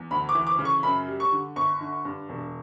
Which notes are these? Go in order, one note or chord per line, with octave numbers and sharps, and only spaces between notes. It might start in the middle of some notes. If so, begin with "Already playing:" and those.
Already playing: E2
D2 B5
D6
E3
D6
C#3
C#6
F#2 B5
G3
C#6
D3
G1 C#6
D3
G2
E1